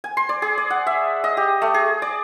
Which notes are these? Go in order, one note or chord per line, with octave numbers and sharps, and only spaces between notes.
G#5
C6
D5
G#4
D5
F#5
E5
D#5
G4
A3
G#4
D5